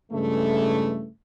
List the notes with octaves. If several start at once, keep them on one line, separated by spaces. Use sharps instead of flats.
G2 C#3 E3 G#3 A3